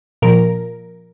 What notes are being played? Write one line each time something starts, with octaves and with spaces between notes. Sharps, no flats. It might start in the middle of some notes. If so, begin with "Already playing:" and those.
A#2 F3 A#4